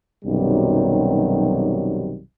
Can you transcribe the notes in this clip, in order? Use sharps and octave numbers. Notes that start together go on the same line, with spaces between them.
B1 F#2 C3 D#3 F#3 G3